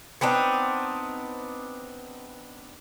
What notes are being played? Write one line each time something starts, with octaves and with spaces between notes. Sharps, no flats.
B3 C4 D4 D#4